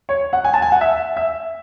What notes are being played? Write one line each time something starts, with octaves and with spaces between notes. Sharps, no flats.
C#5
F#5
G#5
A5
G#5
F#5
E5
E5